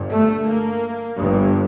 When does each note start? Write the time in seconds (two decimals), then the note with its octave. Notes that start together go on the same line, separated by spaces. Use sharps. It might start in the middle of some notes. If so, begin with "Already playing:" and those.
Already playing: G1 G2
0.11 A3
0.47 A#3
1.17 G1 G2